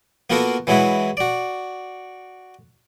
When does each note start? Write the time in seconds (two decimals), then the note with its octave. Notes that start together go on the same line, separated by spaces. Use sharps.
0.30 A#3 B3 F4 F#4 A4 A#4
0.67 E3 F#3 G#3 E4 F#4
1.17 F#4 D5